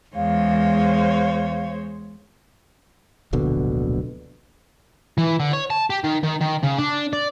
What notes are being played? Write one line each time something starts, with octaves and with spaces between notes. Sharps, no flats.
E2 G#3 C5 C#5 F5
D1 A#1 B2 D3
E3
D3
C#5
A5
G4
D#3
D#3
D#3
C#3
D4
D5